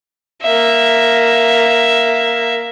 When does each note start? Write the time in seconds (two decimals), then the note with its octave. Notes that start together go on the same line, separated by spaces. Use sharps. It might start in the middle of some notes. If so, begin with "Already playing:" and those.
0.42 A#3 E5